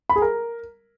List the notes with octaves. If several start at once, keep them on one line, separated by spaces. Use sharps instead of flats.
B5
G#4
A#4